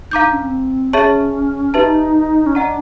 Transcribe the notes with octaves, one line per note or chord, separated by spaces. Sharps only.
D#4 F5 A#5 D6 G6
D4
C#4
C4
C#4 G#4 C#5 E5 A5 C#6
D#4 G4 B4 E5 A5
C#4
D4 D#5 F#5 A#5